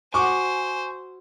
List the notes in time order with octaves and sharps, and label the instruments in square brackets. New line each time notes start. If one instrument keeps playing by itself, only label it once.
[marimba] F#4 F#5 [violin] C5 [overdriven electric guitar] G#5 [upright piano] C#6 D6